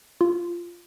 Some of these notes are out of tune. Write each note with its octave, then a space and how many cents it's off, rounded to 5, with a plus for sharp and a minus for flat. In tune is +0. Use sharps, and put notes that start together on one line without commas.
F4 -10